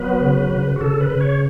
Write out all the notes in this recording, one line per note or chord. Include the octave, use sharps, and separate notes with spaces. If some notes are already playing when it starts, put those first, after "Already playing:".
Already playing: F#3 B3 B4
C#3
C#3
F#4
C#3 A4
B4
C#3
C#5